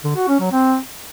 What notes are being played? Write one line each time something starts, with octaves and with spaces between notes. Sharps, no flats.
D3
F#4
C#4
F#3
C4